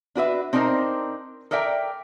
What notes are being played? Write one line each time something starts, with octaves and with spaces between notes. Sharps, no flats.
D4 F#4 B4 E5
C4 D4 D#4 A#4 C5
A4 A#4 D5 E5 G5